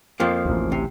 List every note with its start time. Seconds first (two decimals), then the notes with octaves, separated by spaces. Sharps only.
0.20 F2 F3 A#3
0.45 A1 D2
0.72 C3